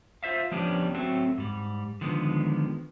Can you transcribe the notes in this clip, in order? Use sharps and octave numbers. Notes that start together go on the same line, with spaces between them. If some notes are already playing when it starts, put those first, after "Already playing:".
F4 C5 E5 F5
F3 G3 B3 C#4 D4 G4
F#3 A3 C4 F#4
G#2 G3
D3 D#3 F3 G#3 B3